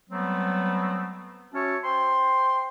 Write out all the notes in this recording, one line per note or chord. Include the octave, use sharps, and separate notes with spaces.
F#3 G3 A3 B3 C4
C#4 F#4 C#5 E5 A5
C5 G5 C6